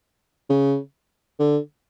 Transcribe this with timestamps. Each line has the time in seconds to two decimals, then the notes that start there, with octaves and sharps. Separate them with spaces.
0.50 C#3
1.39 D3